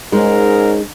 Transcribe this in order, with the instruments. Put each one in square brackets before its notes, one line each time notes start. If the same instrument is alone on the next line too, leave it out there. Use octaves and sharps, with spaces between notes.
[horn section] G#2 C#4 A#4 [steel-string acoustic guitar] G#3 D#4